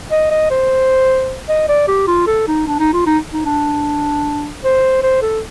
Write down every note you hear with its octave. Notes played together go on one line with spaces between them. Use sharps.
D#5
D#5
C5
D#5
D5
G4
F4
A4
D#4
D4
D#4
F4
D#4
D#4
D4
C5
C5
A4